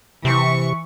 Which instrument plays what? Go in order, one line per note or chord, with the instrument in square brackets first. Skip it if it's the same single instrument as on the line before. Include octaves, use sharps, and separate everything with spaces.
[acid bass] C3 [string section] E3 C#6